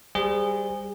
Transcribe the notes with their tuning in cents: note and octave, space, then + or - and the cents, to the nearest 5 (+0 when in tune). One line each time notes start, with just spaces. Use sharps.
G3 +0 G#4 -25 C5 -10